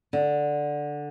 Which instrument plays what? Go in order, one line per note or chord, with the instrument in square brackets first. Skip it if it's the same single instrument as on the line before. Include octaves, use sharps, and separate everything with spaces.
[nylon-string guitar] D3